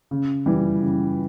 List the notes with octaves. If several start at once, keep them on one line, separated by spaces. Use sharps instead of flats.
C#3
E3 G3
C#3